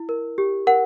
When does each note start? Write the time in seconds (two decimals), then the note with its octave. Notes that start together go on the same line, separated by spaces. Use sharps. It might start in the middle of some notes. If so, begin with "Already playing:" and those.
Already playing: E4
0.09 A#4
0.38 G4
0.67 A#4 F#5